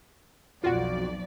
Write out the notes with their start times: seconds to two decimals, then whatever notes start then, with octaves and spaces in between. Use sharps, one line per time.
0.64 B1 F2 F4 F#4 D5